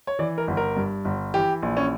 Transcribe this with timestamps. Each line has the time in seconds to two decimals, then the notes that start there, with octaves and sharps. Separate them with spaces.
0.07 C#5
0.19 E3 D5
0.38 A#4
0.47 G1
0.57 A#4
0.77 G2
1.05 G1
1.34 E3 G4
1.63 A#1
1.77 C#4